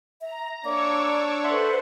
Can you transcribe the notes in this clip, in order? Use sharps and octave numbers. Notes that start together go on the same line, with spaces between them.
E5 A#5
A#3 D4 C#5 D5 C#6 D6 E6
A4 B4 C5 E5 F#5 C6